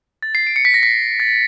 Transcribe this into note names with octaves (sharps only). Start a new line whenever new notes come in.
A6
C7
D7
C#7
B6
A#6
B6
A6